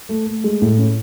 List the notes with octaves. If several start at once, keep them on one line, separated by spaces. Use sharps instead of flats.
A3
A3
G#3
A2
C#4